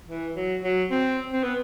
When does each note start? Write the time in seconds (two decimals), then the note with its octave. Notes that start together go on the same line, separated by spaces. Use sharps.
0.08 E3
0.36 F#3
0.64 F#3
0.91 C4
1.33 C4
1.43 B3